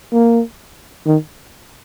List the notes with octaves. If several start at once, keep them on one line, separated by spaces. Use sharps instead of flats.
A#3
D#3